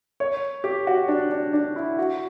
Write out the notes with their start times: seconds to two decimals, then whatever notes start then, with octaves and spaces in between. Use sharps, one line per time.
0.20 C#5
0.64 G4
0.87 F#4
1.08 D4
1.31 D4
1.53 D4
1.76 E4
1.98 F#4